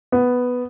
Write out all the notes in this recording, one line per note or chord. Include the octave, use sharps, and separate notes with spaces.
B3